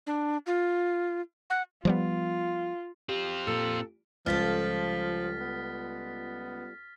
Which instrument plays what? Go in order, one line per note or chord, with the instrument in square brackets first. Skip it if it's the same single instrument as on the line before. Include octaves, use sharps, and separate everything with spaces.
[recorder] D4
F4
F#5
[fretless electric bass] F3 G3 B3 [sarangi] F4
[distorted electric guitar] C4 F4 [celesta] G4
[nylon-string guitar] A#2 [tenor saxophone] A4
[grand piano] C#2 [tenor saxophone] F3 [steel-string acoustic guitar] G3 F4 A4 [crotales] F6 A6 B6
[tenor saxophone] B3